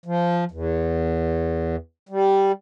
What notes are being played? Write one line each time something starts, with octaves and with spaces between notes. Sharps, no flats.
F3
E2
G3